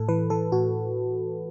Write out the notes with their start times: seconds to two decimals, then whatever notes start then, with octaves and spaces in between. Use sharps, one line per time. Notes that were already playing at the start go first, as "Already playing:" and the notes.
Already playing: A2 A4
0.08 E3 B4
0.30 E3 A4
0.52 A2 F#4